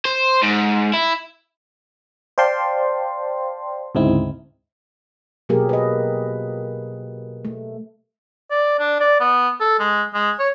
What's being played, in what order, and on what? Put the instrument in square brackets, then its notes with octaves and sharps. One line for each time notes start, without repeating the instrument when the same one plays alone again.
[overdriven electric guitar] C5
G#2
E4
[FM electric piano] C5 D5 F5 G5 A5 C6
D2 G#2 C#3 C4 D#4 E4
[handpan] B2 F#3 A#3 G4 G#4 A#4
B4 D#5
A3
[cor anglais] D5
D4
D5
B3
A4
G#3
G#3
C#5